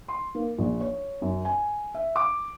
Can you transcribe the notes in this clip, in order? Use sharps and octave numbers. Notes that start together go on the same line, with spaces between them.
C6
A#3
A#1
C#5
F#2
G#5
E5
D6